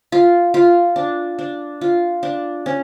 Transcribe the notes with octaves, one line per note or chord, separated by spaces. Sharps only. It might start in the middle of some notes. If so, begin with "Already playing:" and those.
F4
F4
D4
D4
F4
D4
C#4